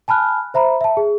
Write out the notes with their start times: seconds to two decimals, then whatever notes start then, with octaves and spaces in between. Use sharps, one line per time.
0.08 G#5 A5 B5 F6 F#6
0.54 C5 E5 A#5 B5
0.81 E5 A5
0.97 G#4